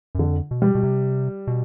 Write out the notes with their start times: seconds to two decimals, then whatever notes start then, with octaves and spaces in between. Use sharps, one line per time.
0.15 F#2
0.19 F2 D3
0.51 B2
0.62 G3
0.75 B2
0.83 C3
1.47 B2